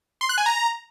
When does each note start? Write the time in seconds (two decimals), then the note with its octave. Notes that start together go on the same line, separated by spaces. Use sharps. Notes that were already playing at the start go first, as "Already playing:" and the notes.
0.21 C6
0.29 F#6
0.38 G#5
0.46 A#5